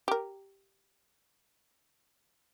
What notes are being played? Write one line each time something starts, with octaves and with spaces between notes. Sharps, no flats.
G4 A#4